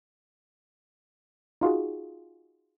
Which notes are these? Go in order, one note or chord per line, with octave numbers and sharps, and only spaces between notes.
D#4 F4 F#4 G#4